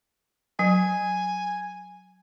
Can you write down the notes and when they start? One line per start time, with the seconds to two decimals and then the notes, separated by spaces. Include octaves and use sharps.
0.59 F#3 G#5